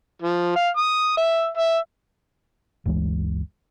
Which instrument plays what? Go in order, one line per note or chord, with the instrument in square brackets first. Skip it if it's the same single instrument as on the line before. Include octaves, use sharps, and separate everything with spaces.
[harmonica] F3
F5
D#6
E5
E5
[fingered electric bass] G1 D2 E3 G#3